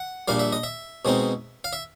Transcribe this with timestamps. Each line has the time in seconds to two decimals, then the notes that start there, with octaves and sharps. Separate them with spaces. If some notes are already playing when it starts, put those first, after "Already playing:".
Already playing: F#5
0.28 A#1 A#2 G3 F5
0.39 E5
0.53 D#5
0.63 E5
1.05 B2 G#3 C4 D#4
1.64 F5
1.73 E5